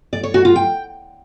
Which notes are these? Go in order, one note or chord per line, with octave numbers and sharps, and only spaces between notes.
D5
C#5
F#4
F4
G5